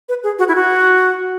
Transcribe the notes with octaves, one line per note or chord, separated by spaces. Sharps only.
B4
G#4
F#4
E4
F#4